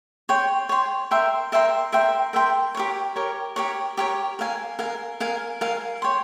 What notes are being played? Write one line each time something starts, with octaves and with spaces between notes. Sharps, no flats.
C#5 G5 C6
C#5 G5 C6
A#4 E5 G5 C6
A#4 E5 G5 C6
A#4 E5 G5 C6
A#4 E5 G5 C6
G4 A#4 C#5
G4 A#4 C#5
G4 A#4 C#5
G4 A#4 C#5
A#4 F5 G#5
A#4 F5 G#5
A#4 F5 G#5
A#4 F5 G#5
C#5 G5 C6